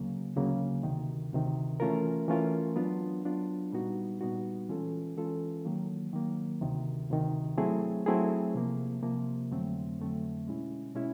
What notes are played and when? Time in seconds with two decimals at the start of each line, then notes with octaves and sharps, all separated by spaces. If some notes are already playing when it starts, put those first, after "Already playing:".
Already playing: D2 C#3 F#3 A#3
0.36 D2 C#3 F#3 A#3
0.83 D2 C3 D#3
1.32 D2 C3 D#3
1.80 E3 A3 C#4 F4 A#4
2.28 E3 A3 C#4 F4 A#4
2.76 F#3 B3 D4 F4
3.25 F#3 B3 D4 F4
3.73 A#2 G3 B3 D#4 F#4
4.21 A#2 G3 B3 D#4 F#4
4.69 E3 G#3 C#4 F4 A4
5.17 E3 G#3 C#4 F4 A4
5.65 D#3 F#3 A#3
6.13 D#3 F#3 A#3
6.61 D2 C3 D#3
7.10 D2 C3 D#3
7.57 F#3 A3 C4 E4 G#4
8.06 F#3 A3 C4 E4 G#4
8.54 C3 F3 A#3
9.03 C3 F3 A#3
9.51 F2 D3 F#3 A3 C4
9.99 F2 D3 F#3 A3 C4
10.48 B2 G#3 C#4 E4
10.95 B2 G#3 C#4 E4